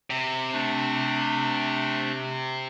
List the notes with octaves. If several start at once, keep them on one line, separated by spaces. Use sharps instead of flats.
C3
A3 D4